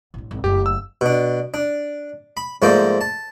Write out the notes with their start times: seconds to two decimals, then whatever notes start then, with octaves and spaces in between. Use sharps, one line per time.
0.14 A1 D4
0.31 G#1
0.44 F#1 A3 G4
0.66 E6
1.01 B2 D4
1.54 D4
2.37 B5
2.62 G#2 F3 A3 A#3 C5 D5
3.01 A5